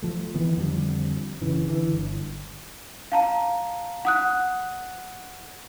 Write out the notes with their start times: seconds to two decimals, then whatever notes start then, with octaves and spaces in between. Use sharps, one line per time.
0.02 F3 A3
0.35 D#3 E3 B3
0.57 F2 D3 F3 G3
1.41 F#1 C#3 E3
1.67 D3 E3
1.93 G1
3.12 F5 A5 A#5
4.05 F#5 D#6 F#6